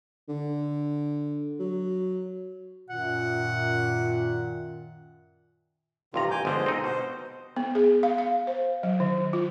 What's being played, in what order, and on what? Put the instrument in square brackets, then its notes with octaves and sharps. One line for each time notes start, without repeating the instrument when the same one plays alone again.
[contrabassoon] D3
F#3
[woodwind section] F#2 A#2 D#3 [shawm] F#5
[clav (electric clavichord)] A1 G2 A#5 [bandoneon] C3 D#3 F4
[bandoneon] G#5 D6 G6
[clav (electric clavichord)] G1 D3 F3 [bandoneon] G#3 C5 D#5
[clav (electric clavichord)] C4 D#4
[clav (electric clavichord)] B2 [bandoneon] C5
[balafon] B3
G#4
F5
F5
C5
F#3
D#3
F4